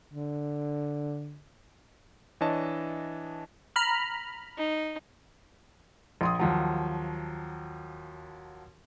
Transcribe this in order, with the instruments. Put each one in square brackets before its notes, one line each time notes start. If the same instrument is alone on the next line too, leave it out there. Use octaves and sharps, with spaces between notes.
[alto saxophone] D3
[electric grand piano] E3 D4 C#5 D#5 A5
[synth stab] A#5 B5 F6
[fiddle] D#4
[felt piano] A#1 C6 D#6
D#2 F3 F#3